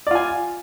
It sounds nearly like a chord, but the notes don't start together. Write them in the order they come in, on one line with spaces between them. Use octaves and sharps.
D5 F4 G#5